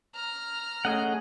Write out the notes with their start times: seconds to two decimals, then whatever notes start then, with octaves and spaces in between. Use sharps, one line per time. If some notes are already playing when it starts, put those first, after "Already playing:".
0.14 A#5 F6
0.85 A3 C#4 G#4 D#5 F#5